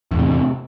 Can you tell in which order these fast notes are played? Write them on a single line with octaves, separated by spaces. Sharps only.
E2 A2 C3